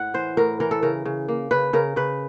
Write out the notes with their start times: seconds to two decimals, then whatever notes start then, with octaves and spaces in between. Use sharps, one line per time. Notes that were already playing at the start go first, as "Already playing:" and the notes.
Already playing: A2 F#5
0.14 E3 C5
0.37 A2 A#4
0.60 E3 A#4
0.71 A4
0.83 C#3 A#4
1.05 C#3
1.28 A#3
1.51 C#3 B4
1.73 C#3 A#4
1.96 C#3 B4